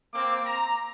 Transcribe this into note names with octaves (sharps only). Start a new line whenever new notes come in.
A#3 C4 D6
A#5